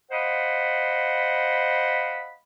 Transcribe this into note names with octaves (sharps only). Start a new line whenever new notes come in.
C5 D#5 F5 F#5 B5